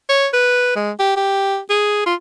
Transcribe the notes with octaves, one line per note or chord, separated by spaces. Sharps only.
C#5
B4
G#3
G4
G4
G#4
F4